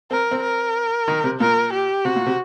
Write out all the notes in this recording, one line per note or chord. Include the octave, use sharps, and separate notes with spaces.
C4 A#4
C4
A#4
D#3
C3
A#2 A#4
G4
C3 F#4
A#2
C3